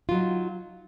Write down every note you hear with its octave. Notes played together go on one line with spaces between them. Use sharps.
F#3 D#4 F4